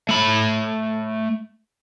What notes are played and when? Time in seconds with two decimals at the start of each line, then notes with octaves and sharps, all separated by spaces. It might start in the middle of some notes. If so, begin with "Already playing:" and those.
0.09 A3 B5